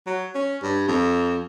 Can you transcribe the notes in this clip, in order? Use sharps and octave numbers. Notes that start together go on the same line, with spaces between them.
F#3
C#4
G2
F2